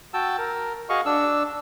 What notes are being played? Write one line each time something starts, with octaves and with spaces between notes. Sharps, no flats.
F#4 G5 A5 E6
A#4
F#4 G#4 D#5 F5 C#6
D4 E6